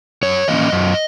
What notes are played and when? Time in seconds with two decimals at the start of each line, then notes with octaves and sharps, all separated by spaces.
0.23 F#2 C#5
0.48 E3 A#3 C#4 D#5
0.72 F#2